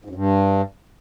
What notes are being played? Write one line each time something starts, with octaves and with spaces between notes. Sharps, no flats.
G#2
F#2
G2